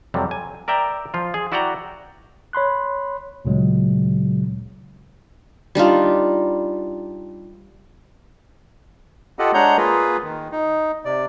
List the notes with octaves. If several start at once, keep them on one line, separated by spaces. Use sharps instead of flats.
F2 C3 F#3 G3
G#5
A#4 D5 E5 G5 A#5
F3 F4
G#4
E4 F#4 D5 F#5 G5 A#5
C#5 B5 C6 F#6
D2 A#2 C#3 F#3 G#3
G3 D4 D#4 F4
F4 G4 A4 D#5 F#5
G#3 D4 C#5 F#5 A#5 G6
A#3 F4 G#4 B4
D#3
D#4
C3 D5